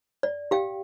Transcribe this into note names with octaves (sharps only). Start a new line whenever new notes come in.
D5
G4 F5 G5